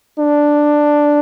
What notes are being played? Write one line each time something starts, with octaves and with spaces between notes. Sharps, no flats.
D4